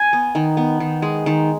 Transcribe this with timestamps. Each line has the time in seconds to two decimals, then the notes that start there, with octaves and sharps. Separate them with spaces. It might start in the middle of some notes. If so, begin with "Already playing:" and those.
Already playing: G#5
0.13 B3
0.35 D#3
0.57 B3
0.80 D#3
1.02 G#3
1.26 D#3